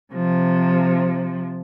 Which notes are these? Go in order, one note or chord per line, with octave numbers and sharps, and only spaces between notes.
C3 F3